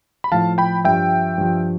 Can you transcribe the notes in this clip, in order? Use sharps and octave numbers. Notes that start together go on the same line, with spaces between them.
B5
A2 F3 F5 A5
G5 B5
G2 F3 E5 G5
G2 F3